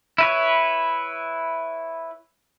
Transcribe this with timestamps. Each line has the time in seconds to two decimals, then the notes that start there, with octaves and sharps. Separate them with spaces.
0.18 E4 B4 C#5